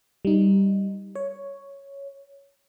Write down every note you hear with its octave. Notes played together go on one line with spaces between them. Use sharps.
G3 D#4
C#5